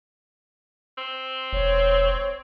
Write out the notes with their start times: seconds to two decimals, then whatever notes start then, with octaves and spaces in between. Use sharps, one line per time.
0.97 C4
1.53 E1 C#5